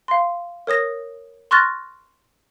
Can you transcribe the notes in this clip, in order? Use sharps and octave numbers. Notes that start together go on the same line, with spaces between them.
F5 C6
A#4 C#5 D#6 A#6
C6 C#6 F6 F#6 A6 A#6